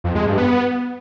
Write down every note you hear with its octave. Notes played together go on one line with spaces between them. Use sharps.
F2
G#3
G2
B3